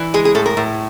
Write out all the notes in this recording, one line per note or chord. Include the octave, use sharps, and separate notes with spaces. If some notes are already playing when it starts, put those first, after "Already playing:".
Already playing: E3
G#3 G#4
G#4
A2 A4
A#4
A2